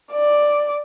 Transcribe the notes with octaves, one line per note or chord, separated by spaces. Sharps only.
D5